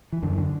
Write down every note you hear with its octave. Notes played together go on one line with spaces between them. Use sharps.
E3
F#2 D3
D3